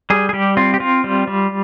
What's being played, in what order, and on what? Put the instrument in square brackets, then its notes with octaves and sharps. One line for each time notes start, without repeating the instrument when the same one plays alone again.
[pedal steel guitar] G3 G#4
G#4
G3 G4
C4 F4
G4
C4 F4
G3
G3